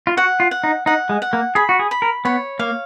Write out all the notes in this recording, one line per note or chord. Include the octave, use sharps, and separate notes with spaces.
F4
F#4 F#5
F4
F#5
D#4
D#4 F#5
G#3
F#5
A#3
G#4 B5
F#4
G#4
B5
A#4
B3 C#5
A#3 F5